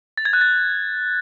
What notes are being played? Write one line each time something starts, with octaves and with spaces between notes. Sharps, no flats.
A6
G#6
F#6
A6